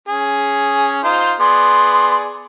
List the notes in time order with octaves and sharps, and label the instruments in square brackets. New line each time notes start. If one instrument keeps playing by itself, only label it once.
[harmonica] C#4 G#4
D#4 F4 C5
[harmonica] B3 G#4 D5 [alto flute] C6